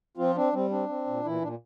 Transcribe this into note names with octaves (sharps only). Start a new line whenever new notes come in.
F3 C4 F4
C4 D4
G3 C4
C4 D4
C4
A#2
A#2 E3 E4
A#2 D4